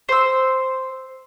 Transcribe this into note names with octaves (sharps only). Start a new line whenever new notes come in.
C5 E6